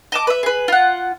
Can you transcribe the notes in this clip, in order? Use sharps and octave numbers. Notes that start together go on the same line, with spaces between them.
D#5 A5 D6
B4 E5
G#4 B4
F4 F#5